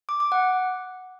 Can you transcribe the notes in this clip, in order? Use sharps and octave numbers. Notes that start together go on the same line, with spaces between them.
D6
D6
F#5